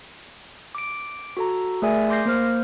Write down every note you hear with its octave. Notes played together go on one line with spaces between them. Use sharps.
D6 D7
F#4 A4 A#5
A3 G#4 A#4 D5 E5 G#5
C6 D6 G6 A#6 C7
A#3 A#4 C5 F6